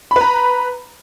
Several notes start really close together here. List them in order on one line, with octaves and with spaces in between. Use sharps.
B5 B4 A#5